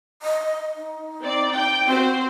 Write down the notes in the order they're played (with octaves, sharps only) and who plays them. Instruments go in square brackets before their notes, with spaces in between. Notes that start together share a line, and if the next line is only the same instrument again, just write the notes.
[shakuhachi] D#5
D#4
[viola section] C4 D5
G5
[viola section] C4 C5 [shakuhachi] F#4